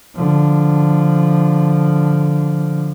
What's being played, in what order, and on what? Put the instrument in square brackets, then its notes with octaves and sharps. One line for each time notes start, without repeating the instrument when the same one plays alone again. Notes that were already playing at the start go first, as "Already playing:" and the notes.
[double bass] D3 F3